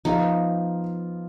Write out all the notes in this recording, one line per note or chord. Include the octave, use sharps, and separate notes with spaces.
F3 B3 D#4 F4